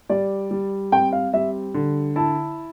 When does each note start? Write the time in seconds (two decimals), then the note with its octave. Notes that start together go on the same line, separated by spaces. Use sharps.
0.10 G3 D5
0.51 G3
0.92 C4 G5
1.12 F5
1.33 G3 E5
1.74 D3
2.16 E4 A5